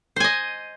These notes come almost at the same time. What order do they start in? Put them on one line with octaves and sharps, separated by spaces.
C5 G#5 D#5